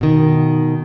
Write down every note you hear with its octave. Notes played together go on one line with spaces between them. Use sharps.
B2 D#3